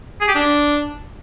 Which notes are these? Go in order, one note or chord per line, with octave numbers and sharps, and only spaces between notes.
G#4
G4
D4